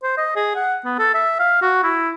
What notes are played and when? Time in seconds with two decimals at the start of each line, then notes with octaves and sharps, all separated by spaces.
0.03 C5
0.17 D#5
0.36 G#4
0.55 F#5
0.84 B3
0.99 A4
1.14 E5
1.39 F5
1.62 F#4
1.83 E4